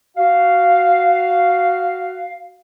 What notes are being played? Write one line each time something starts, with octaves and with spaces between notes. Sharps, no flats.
F#4 F5